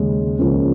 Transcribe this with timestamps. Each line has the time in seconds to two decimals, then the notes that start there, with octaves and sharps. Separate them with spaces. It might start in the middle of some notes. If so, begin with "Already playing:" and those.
Already playing: D#2 C#3 G#3 C#4
0.39 C#2 C#3 F3 A#3 C#4